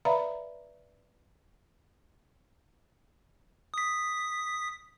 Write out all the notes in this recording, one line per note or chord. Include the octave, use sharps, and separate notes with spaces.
B4 D5 E5 F5 A#5 B5
D#6 B6